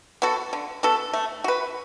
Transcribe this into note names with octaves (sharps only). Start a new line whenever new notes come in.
B3 F#4 A4
D3
B3 F#4 A4
A3
F#4 B4